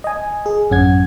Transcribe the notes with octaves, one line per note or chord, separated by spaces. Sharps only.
D#5 G#5
G#4
A1 F#2 C#4 F#5 G#6